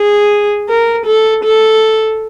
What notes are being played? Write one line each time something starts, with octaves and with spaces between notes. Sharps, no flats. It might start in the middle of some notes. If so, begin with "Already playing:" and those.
Already playing: G#4
A#4
A4
A4